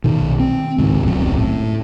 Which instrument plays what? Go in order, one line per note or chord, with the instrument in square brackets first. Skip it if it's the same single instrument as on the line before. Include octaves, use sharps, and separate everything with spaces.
[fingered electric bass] B1 B2 D#3
C4
C#2 G#2 D#3
D1 B1 F#2 C4
A2